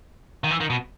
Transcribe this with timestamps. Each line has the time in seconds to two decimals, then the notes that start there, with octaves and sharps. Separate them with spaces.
0.44 D#3
0.51 E3
0.60 D#3
0.70 B2